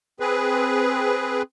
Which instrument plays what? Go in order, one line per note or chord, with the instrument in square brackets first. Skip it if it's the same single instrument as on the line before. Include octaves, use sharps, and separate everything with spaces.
[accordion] C4 G#4 B4